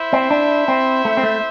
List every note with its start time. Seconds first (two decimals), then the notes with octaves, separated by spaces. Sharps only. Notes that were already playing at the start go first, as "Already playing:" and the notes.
Already playing: E4 C5 E5
0.13 C4
0.31 D4
0.68 C4
1.05 A3
1.17 C4
1.23 A3